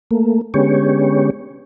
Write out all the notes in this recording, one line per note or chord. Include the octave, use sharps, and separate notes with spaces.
A3 A#3
D3 G#3 B3 C#4 G4 C#5